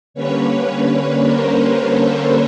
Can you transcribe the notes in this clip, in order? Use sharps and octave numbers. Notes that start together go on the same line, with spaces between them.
D3 G3 A#3 C#4 B4 C#5
A#4 C5
A4 B4